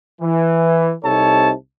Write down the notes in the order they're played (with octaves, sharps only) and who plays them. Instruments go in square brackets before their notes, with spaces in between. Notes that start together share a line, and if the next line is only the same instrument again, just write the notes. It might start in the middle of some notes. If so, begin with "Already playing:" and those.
[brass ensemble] E3
C2 C3 D#4 A4 C#5 A5